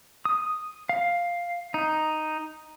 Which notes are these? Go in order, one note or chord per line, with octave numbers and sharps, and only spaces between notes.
D#6
F5
D#4